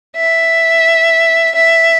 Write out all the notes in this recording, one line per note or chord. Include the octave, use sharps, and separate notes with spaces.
E5
E5